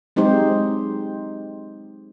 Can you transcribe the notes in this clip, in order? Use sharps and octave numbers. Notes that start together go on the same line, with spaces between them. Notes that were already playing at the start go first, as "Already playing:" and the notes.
F#3 G#3 C4 D#4 G4 C5